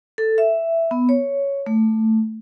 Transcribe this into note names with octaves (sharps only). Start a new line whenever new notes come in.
A4
E5
B3
C#5
A3